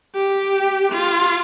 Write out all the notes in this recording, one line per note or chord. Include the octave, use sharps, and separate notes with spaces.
G4
F4